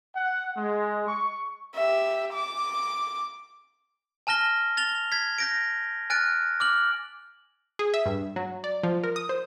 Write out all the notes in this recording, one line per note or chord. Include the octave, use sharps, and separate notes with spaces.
F#5
G#3
C#6
G4 E5
D6
G#5 A5 F6 A#6 G7
A6 F7 G7
G#6 B6
G6 A#6 D7
G#5 F6 F#6 A6 D7
D6 F6 F#7
G#4
E5
G2
F#3
D5
F3
A#4
D#6
C5